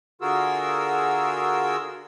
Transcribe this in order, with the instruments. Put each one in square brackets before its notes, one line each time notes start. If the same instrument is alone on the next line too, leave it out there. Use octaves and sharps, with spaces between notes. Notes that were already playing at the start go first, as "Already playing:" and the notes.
[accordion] D3 F4 F#4 G#4 A#4 E6